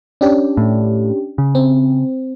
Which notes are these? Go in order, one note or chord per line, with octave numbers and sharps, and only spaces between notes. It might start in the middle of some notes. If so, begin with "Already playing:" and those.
C#4 D4 G4
A2
C#3
C4